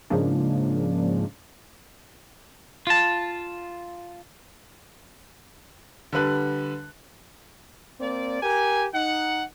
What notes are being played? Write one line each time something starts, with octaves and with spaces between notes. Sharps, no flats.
G#2 C#3 F3 G#3 A#3 D4
F4 A5
D3 G3 B4 F#6
A#3 C4 D5
G4 A#4 G#5
D#4 F#5